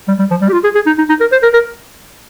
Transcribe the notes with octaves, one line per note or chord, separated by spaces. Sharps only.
G3
G3
F3
G3
G4
F4
G#4
G#4
D#4
D#4
D#4
A#4
C5
A#4
A#4